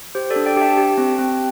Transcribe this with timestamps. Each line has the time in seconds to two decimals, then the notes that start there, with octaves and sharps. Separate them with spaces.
0.15 G4 C5
0.30 A4 D5
0.36 D4
0.46 D5 G5
0.57 G4 G5
0.61 E5 A5
0.77 G4
0.98 C4
1.19 C4